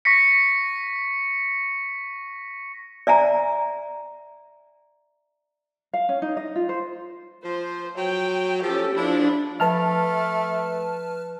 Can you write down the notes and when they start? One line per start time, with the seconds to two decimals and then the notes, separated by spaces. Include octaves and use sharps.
0.05 C#6 A#6 B6 C#7
3.07 D5 E5 G#5 A#5
5.93 F5
6.09 C#4
6.22 D#4
6.37 D#5
6.56 F4
6.69 C5
7.45 F3 C5
7.97 F#3 G5
8.63 F3 C#4 G4 A4
8.96 F3 D4 E4
9.60 F3 A3 B4 A5 F6